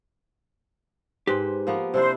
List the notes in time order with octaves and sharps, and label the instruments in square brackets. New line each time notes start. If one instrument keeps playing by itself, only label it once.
[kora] G#2 [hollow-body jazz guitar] G4 B4 C5
[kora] F3 A#3 B3
[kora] C3 D4 E4 [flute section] C5